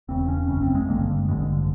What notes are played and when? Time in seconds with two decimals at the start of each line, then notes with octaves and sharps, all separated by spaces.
0.08 E1 E2 C#3 C4
0.28 C#4
0.48 G#1 F#2 C#3 C#4
0.62 C4
0.75 G#3
0.88 G#1 G2 D3 A#3
1.28 A1 G2 D3 G#3